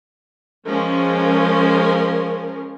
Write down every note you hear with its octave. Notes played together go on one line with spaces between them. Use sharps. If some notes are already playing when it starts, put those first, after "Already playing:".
F3 G#3 C#4 A#4